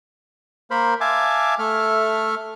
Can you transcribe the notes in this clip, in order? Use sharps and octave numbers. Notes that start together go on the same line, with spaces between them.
A#3 A#4 C5 B5
E5 F5 G#5 A5 D6
A3 A4 E5 F6